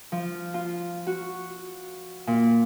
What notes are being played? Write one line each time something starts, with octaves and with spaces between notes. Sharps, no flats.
F3
F4
F#4
A#2